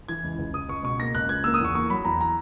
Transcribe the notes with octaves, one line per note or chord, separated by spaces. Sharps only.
E3 G#6
C#2
C#2
C#2 D#6
C#2 C#6
B2 C#6
A#3 A#6
C#2 F#6
C#2 G#6
A#3 E6
D#6
E2 C#6
A#3 C#6
F#3 B5
E2 A#5
A#5